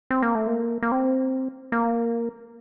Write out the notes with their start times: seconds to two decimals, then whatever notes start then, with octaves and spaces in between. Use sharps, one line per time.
0.10 C4
0.22 A#3
0.35 A3
0.47 A#3
0.83 A#3
0.92 C4
1.72 A#3